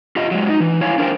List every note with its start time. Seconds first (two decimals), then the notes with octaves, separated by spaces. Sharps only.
0.16 F4 G4 D#5
0.31 F#3 G#3
0.49 D#4
0.60 E3
0.81 E4 C#5 F5 G#5
0.98 D4 A#4 C5 G5